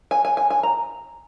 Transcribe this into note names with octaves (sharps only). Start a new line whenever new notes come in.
G#5
G#5
G#5
G#5
A#5